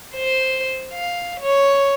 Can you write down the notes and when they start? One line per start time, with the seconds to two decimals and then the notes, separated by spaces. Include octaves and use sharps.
0.14 C5
0.93 F5
1.40 C#5